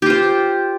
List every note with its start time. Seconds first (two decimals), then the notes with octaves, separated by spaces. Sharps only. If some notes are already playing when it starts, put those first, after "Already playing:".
0.02 G4
0.06 F4
0.10 C5